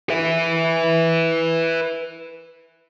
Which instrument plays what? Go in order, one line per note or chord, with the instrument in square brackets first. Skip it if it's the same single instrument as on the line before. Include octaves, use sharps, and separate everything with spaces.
[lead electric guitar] B4 E5